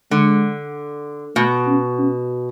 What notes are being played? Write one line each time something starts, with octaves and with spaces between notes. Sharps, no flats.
D3 G#3
B2 A3
C#4
C#4